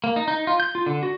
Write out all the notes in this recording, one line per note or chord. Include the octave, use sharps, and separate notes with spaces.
A#3
D#4
D#4
F4
G6
F4
D3
F#4